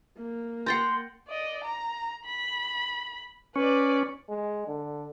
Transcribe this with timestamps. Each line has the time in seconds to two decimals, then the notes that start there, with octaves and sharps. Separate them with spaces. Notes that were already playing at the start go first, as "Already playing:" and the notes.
0.17 A#3
0.66 F#5 G5 A#5 C6 G6 A6 C7
1.28 D5 D#5
1.64 A#5
2.25 B5
3.56 C#4 B4 D5
4.29 G#3
4.68 D3